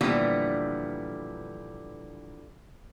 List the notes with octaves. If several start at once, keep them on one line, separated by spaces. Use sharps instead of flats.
A#2 D3 E3 F3 G3 B3